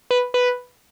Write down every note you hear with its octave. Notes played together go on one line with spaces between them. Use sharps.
B4
B4